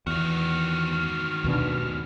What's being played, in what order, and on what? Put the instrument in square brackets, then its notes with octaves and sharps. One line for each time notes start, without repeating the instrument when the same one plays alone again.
[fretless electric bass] E2 [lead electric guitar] D#3 F#4 [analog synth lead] F6
[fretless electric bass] D#2 B2 D4